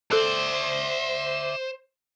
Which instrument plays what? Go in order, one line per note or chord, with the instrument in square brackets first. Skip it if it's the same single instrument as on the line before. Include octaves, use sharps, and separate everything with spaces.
[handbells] A4 E6 F#6 [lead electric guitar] C5 [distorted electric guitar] D5 E5